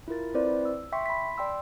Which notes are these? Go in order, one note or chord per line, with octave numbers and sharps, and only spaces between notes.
E4 F4 A#4 A6
C4 E4 B4 C5 D5
E6
E5 G5 C6 C#6 B6
B5 C6 B6
D5 G5 C6 E6